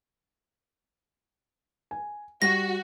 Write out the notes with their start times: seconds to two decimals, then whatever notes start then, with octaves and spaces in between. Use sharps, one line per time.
1.91 G#5
2.42 G3 F#4 A#6